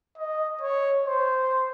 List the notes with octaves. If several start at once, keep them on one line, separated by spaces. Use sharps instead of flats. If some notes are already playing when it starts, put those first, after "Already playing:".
D#5
C#5
C5